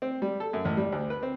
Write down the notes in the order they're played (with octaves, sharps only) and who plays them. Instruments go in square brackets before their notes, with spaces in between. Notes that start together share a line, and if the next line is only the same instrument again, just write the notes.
[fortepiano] C4
G3
A4
F#2
A1
G3
D2
B4
C4